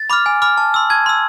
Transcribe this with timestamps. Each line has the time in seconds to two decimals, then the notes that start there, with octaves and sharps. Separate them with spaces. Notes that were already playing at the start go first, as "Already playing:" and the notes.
Already playing: A6
0.10 B5 D6 F6
0.26 G#5
0.42 B5 D6 F6
0.58 A5
0.74 C6 E6
0.90 A5 G#6
1.06 C6 E6